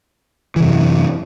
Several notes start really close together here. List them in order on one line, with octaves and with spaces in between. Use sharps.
E3 C3 F#2